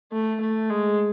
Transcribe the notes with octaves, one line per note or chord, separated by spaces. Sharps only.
A3
A3
G#3